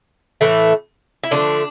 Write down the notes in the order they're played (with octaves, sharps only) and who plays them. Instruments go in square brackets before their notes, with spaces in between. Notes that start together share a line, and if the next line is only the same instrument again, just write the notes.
[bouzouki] A2 E3 A3
E4
D3 F3 A3 D4